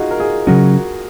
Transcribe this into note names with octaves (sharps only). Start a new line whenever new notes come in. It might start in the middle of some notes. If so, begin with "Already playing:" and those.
Already playing: D#4 F4 F#4 G#4
A#4
F4 G#4
C#3 F#3 C#4 F#4 A#4